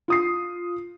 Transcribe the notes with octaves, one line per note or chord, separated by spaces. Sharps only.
F4 D#6 C7